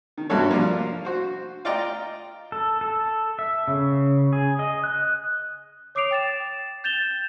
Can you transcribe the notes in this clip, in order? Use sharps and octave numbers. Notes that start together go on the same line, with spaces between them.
D#3
G2 C3 A#3 F#4 A4 C#5
F3 A#3 D4 F5
F#4 C5
F4 D5 D#5 G5 A#5
A4
A4
E5
C#3
G#4
D#5
F#6
C#5 D6 D#6 C7 D7 F7
G5 A6 E7
G6 A6 E7 F7 G7